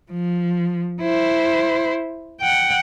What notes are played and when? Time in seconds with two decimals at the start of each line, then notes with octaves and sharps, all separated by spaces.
0.11 F3
1.01 E4 C5
2.41 F#5 G5